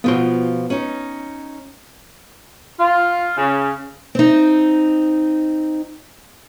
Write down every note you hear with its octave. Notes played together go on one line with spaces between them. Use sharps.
B2 F3 B3 F4 C6
C#4 D#4
F4
C#3
C4 D#4